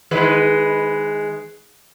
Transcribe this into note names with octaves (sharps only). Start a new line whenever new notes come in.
D#3 G#3 B4